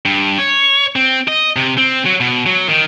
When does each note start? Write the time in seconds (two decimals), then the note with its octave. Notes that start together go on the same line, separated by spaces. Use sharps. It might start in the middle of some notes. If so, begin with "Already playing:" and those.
0.05 G2
0.38 C#5
0.96 C4
1.28 D#5
1.56 C3
1.78 C4
2.05 F#3
2.20 B2
2.46 F#3
2.69 D#3